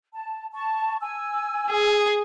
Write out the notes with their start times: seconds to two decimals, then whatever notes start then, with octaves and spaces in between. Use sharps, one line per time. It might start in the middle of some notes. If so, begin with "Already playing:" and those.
0.13 A5
0.53 A5 C#6
1.01 G#5 E6
1.71 G#4